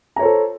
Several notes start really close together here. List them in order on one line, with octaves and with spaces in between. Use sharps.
A#5 C#5 C5 A4